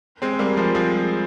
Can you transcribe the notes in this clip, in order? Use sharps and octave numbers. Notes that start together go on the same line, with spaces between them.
G#3 C4
G3 A#3
F3 G#3
F3 G#3